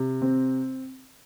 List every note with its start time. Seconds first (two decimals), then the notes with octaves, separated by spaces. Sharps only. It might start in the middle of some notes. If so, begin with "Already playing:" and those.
Already playing: C3
0.22 C4